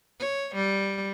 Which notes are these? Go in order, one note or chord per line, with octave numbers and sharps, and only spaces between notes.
C#5
G3